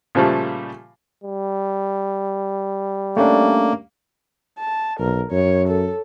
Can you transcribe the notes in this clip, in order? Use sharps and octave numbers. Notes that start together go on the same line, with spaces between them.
A#2 C#3 F3 G3 A3
G3
A3 A#3 C#4 D4
A5
B1 A#4
F#2 C#5
A4